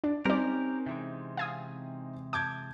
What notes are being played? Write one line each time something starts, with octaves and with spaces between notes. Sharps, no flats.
D4 D5
G3 C4 C#4 D#4 G4 A#4 D5
C3 E3 G#3
F5 G#5 D#6
A5 D6 G6 G#6